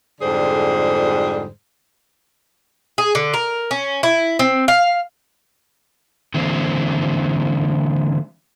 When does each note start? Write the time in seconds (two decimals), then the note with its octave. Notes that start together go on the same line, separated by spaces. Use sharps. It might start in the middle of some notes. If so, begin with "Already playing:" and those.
0.21 F2 G#2 D3 G3 G#4 C5
2.98 G#4
3.15 D3
3.34 A#4
3.71 C#4
4.03 E4
4.39 C4
4.68 F5
6.34 D3 E3 G#3 A#3 C4